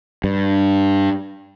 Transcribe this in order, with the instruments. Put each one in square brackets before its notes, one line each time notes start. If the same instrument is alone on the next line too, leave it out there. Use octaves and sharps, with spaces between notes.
[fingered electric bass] G2